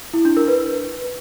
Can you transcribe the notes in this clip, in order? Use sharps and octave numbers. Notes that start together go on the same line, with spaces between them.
E4
D4
A#4
B4